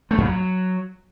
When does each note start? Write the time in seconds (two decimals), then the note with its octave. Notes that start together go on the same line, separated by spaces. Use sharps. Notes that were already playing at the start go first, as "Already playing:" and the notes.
0.11 A3
0.18 F2
0.25 F#3